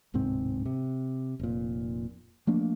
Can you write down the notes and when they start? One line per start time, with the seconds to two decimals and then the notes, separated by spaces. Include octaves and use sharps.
0.14 D1 G#2 C3 C4
0.66 C3
1.40 F1 A#2
2.47 F3 A3 A#3 D4